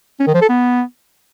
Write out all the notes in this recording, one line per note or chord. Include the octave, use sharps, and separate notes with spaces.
C#4
D#3
F3
A4
B3